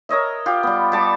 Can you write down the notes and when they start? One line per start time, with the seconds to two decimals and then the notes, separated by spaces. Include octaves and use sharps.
0.09 A#4 C#5 D#5 E5
0.46 F4 G4
0.63 G3 B3
0.92 G3 A5 D6